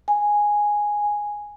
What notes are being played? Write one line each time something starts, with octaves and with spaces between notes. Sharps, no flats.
G#5